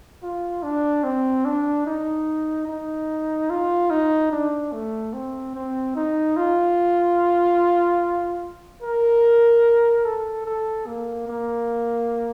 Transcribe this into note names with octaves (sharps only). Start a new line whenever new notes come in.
F4
D4
C4
D4
D#4
D#4
F4
D#4
D4
A3
C4
C4
D#4
F4
A#4
A4
A4
A#3
A#3